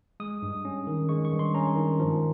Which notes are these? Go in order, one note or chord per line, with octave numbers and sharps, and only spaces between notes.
G#3 D#6
G2
C#4
D#3
G#3 C#6
C#6
G2
C6
C#4 A#5
D#3
F3